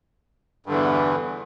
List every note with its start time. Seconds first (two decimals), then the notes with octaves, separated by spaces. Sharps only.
0.66 G2
0.69 D3
0.71 E3
0.74 E2